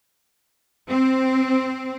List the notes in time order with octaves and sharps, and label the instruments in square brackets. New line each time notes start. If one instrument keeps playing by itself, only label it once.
[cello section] C4